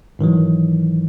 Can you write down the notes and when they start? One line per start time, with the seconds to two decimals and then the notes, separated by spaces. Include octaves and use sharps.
0.19 G#2 D#3 E3 F#3